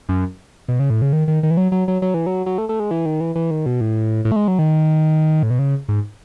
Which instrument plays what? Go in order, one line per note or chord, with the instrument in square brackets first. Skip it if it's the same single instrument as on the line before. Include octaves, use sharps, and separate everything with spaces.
[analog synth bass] F#2
B2
C#3
A2
C#3
D#3
D#3
D#3
E3
F#3
F#3
F#3
F#3
E3
F#3
F#3
A3
A3
G#3
E3
D#3
E3
E3
D#3
B2
A2
A2
A3
G#3
F#3
D#3
A2
B2
C#3
G#2